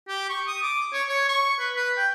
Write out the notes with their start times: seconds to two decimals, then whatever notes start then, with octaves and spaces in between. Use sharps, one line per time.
0.08 G4
0.29 C#6
0.47 D#6
0.63 D6
0.93 C#5
1.09 C#5
1.29 C#6
1.59 B4
1.76 B4
1.97 G5